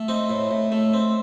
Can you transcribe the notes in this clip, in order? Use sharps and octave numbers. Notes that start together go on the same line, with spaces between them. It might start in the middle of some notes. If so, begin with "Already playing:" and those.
Already playing: A3
C4 D#4
A2
A2
A3
C4